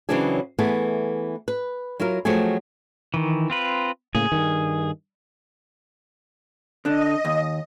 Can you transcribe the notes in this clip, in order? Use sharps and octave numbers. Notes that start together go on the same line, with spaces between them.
C#3 E3 F#3 C4 D4 G#4
E3 A3 B3 G#4
B4
F#3 E4 F4 A#4
F3 F#3 A3 C4 G#4
D#3 E3
C4 F4 B4
A2 C#3 A#3 G#4
G2 D#3
D3 D4 D#5
D#2